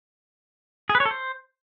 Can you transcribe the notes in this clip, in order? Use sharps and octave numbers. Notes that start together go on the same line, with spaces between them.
G#4
B4
C#5
A4
C5